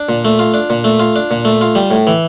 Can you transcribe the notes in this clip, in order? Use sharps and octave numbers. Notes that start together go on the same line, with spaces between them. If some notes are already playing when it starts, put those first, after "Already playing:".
Already playing: D4
A#2
A3
F4
D4
A#2
A3
F4
D4
A#2
A3
F4
G3
A2
E3